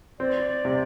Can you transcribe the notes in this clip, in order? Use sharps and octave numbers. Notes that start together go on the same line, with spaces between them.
C4 D5
C3